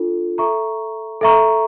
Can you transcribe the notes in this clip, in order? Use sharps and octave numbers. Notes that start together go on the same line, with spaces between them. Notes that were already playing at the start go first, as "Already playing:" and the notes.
Already playing: D4 F4 A4
A4 E5 A#5 C#6
A4 E5 A#5 C#6